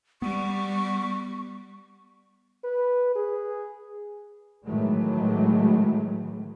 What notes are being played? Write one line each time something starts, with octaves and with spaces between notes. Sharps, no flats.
G3 B3 C#6
B4
G#4
A2 D#3 E3 F#3 G#3 A3